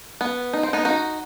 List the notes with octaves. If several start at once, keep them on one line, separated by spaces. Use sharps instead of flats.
B3
D#4
C4
B3 D#4
D#4 F#4